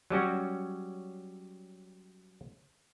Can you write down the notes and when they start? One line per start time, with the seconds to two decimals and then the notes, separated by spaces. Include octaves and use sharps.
0.10 F#3 G3 C#4 F#4